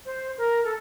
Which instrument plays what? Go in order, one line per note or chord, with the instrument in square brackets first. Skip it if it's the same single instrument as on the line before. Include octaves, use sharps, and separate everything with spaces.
[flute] C5
A#4
A4